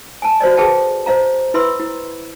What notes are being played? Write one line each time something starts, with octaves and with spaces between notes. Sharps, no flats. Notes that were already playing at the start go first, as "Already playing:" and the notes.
G#5 A5
F#4 C5 D5 D#5
G#4 A4 B4 E5 G5 A5
C5 D#5 F5 A#5
E4 B4 E5 B5 C6 E6
E4